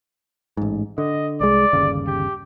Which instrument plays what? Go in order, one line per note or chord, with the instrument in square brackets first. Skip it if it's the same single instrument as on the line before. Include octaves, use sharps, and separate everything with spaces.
[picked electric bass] A1 G#2
[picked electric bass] D3 [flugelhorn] D#5
[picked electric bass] C2 G#3 [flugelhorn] D5
[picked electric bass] G1 D#2 C#3
[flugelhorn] G4